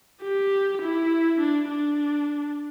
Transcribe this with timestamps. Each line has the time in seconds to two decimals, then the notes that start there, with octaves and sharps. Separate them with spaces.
0.22 G4
0.82 E4
1.40 D4
1.69 D4